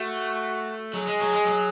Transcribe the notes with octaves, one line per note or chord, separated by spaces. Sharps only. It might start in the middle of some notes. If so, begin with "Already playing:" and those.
Already playing: A3 F#4
F#3 G#4
G#3
F#3
G#3
F#3